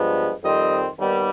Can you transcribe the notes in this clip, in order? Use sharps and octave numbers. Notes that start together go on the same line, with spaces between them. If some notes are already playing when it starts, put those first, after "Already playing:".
Already playing: G2 F3 G#3 B3
F2 D#3 G3 C4 D#5
D#2 D#3 G3 B3